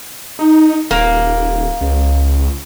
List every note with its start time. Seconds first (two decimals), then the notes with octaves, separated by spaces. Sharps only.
0.39 D#4
0.91 D#1 A#3
1.81 C#2